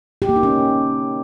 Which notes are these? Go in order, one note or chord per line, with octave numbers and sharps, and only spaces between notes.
G4
A#3
D#4
C#4